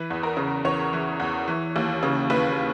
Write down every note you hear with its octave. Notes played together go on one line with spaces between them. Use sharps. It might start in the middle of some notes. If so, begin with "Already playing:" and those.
Already playing: E3 B4
E2
A#4
C#3
E2 C#5
E3
E2
E3
D#2
C#3
D#2 B4